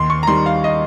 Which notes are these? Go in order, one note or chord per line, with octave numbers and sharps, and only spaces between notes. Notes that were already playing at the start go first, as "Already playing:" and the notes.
Already playing: D#2 C6
C#6
A#5
D#3 G3 C6
F5
D#5